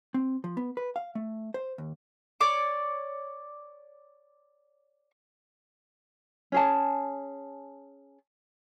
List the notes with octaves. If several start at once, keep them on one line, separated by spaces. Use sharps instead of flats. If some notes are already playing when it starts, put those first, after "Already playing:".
C4
F3
B3
B4
F5
A3
C5
D#2
C#5 D5 D6
C#4 G#4 A5